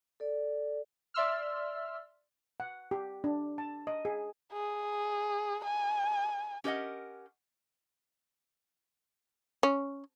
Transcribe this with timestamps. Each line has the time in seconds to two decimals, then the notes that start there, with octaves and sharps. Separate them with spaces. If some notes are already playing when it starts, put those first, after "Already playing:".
0.20 A4 D5
1.14 D5 E5 C6 E6 F6
2.60 F#5
2.91 G4
3.24 D4
3.58 A5
3.87 D#5
4.05 G#4
4.53 G#4
5.65 G#5
6.64 C#4 G4 A#4 D5 D#5 F#5
9.63 C#4